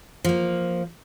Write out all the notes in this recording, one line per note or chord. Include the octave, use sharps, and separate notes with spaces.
F3 A#3